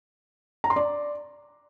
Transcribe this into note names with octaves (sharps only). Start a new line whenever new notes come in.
A#5
C6
D5